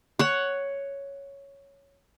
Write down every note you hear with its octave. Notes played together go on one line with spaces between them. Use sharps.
C#5 F#5